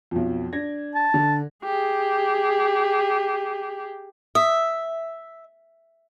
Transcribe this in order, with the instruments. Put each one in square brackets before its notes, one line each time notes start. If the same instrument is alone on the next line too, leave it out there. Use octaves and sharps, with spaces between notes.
[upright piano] B1 F2
D4 G#6 A#6
[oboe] A5
[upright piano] D3 D4
[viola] G4 G#4
[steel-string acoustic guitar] E5 [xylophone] D#6